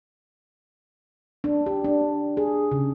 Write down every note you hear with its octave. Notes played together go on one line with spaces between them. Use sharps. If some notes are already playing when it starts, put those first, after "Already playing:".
D4
G4
D4
G#4
C#3